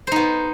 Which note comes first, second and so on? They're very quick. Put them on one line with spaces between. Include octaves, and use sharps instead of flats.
C5 D#4 B3